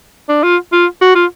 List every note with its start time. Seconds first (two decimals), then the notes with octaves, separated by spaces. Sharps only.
0.29 D4
0.43 F4
0.73 F4
1.01 F#4
1.15 F4